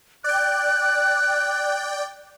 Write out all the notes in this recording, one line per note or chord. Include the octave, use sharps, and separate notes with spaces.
D5 G5 F#6